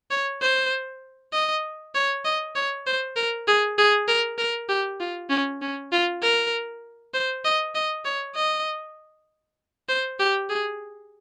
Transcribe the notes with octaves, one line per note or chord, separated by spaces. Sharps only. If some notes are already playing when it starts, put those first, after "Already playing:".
C#5
C5
D#5
C#5
D#5
C#5
C5
A#4
G#4
G#4
A#4
A#4
G4
F4
C#4
C#4
F4
A#4
C5
D#5
D#5
C#5
D#5
C5
G4
G#4